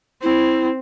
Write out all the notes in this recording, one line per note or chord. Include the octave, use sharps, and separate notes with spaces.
C4 E4